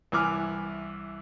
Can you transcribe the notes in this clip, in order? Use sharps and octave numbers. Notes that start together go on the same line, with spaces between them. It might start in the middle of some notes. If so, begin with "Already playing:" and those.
C2 E3 G#5 D6 F6